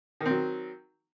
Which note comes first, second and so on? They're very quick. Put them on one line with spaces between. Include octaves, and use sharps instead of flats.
D#3 C4 F#3